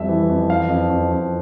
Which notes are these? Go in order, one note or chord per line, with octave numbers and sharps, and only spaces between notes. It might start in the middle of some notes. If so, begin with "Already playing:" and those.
Already playing: F2 G3 E5
E3
F2
E3 F5
F2
F2
F2